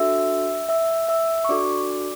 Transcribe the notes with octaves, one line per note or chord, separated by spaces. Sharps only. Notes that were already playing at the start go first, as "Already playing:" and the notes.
Already playing: D4 F#4 A4 E5 E6
E5 E6
E5 E6
C#6
D4 F#4 A4 D5 D6